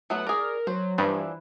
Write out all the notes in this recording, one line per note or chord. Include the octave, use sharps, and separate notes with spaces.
F#3 A3 B3 F#5
G#4 A#4 D5
F#3 C5
G2 E3 F3 D4 A#5